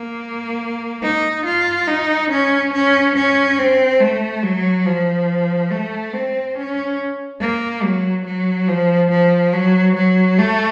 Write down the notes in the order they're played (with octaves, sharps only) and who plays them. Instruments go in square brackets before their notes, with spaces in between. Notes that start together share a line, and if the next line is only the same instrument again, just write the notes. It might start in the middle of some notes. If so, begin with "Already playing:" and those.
Already playing: [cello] A#3
D#4
F4
D#4
C#4
C#4
C#4
C4
A3
F#3
F3
A3
C4
C#4
A#3
F#3
F#3
F3
F3
F#3
F#3
A3